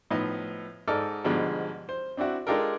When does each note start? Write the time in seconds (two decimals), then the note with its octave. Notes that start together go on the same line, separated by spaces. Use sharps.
0.11 A2 F3 B3 D#4 D#5
0.88 G#2 D#4 A4 D5 F6
1.24 G#2 B2 D3 F3 G3 G#3
1.89 C5
2.17 C4 D4 E4 F#4
2.47 G#3 D4 F4 G4 A4 A#4